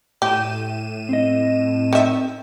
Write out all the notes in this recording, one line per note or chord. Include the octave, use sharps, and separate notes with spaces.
A2 G4 D#7 E7
C4 D#5
D#3 E5